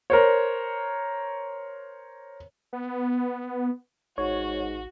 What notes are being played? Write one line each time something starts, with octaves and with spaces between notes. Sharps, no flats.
A#4 C5 C#5
B3
A1 G#2 F#4 C#5